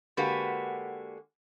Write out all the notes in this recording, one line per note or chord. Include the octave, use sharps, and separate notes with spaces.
D3 G#3 A#3 F#4 G4 B4